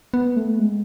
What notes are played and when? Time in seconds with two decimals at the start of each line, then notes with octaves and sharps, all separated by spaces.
0.14 B3
0.37 A3
0.59 G#3